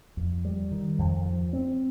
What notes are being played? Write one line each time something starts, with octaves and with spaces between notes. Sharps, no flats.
F2
G3
D#3
F2
F3
C4